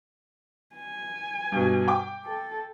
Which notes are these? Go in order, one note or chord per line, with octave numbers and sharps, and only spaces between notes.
G#5
G2 B2
G5 D6
A4